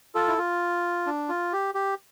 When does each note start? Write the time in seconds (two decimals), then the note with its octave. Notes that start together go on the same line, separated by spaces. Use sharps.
0.15 F4 A4
0.28 E4
0.38 F4
1.06 D4
1.29 F4
1.53 G4
1.75 G4